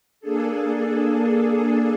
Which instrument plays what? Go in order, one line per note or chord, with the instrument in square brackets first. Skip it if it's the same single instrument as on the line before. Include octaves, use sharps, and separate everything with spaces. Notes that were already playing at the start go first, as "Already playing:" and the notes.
[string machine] A#3 D4 G#4 A4